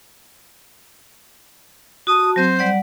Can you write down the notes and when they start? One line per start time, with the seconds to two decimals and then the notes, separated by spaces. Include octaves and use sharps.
2.07 F#4 A5 D#6
2.36 F#3 C4 C5
2.59 G3 D5 F#5